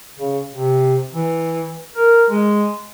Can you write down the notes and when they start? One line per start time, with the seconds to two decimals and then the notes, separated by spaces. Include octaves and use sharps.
0.19 C#3
0.51 C3
1.13 E3
1.96 A#4
2.30 G#3